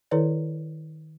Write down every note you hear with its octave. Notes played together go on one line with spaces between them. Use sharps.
D#3 E4 A4 B4 C#5 D5